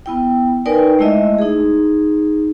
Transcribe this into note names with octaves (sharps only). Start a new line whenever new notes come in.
B3 E4 G5
D#4 A#4 B4 D5 G5 G#5
G#3 A3 E4 D#5 E5
D#4 G#4